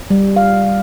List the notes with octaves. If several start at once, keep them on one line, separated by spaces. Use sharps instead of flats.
G3
F5